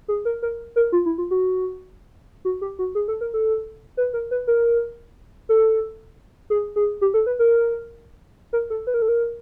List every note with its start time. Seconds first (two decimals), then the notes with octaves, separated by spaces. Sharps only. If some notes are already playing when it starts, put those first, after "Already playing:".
0.08 G#4
0.25 A#4
0.42 A#4
0.76 A#4
0.92 F4
1.06 E4
1.18 F4
1.31 F#4
2.45 F#4
2.61 G4
2.79 F#4
2.95 G#4
3.08 A4
3.21 A#4
3.34 A4
3.97 B4
4.14 A#4
4.31 B4
4.47 A#4
5.49 A4
6.50 G#4
6.76 G#4
7.01 G4
7.14 A4
7.26 B4
7.39 A#4
8.53 A#4
8.70 A4
8.87 B4
8.94 A#4
9.02 A4
9.08 A#4